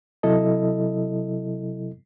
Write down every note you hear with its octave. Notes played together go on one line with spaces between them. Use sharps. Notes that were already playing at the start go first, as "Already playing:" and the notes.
C3 F#3 E4 A4 D#5